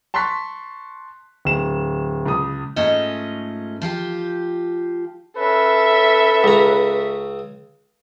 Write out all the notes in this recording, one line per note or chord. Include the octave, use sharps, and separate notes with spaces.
A5 C6 C#6 F#6 B6
D1 E7
C#2 D#6
G#2 A3 C#4 F4 D#5
F3 F4 G4
C#4 A4 B4 E5
C#2 A#5